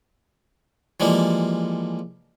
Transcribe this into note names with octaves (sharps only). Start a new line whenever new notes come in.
E3 F3 G3 G#3 A#3